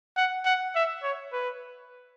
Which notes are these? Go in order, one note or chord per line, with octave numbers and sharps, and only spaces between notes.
F#5
F#5
E5
C#5
B4